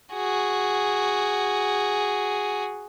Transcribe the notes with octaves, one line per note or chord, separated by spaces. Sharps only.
F#4 G#4